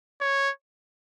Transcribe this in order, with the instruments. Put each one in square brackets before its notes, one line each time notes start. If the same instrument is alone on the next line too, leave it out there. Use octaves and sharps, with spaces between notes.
[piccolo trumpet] C#5